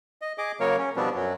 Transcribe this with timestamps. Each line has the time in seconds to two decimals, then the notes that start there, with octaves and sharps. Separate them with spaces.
0.22 D#5
0.38 G#4 D#5 D6
0.60 C#3 F#3 A#3 A#4 C#5
0.78 C#4
0.96 B2 F3 G3 B3 C4 D4
1.15 F#2 F#3